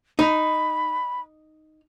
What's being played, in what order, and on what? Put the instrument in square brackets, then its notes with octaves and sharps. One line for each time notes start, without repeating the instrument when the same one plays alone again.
[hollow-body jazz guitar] D#4 [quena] B5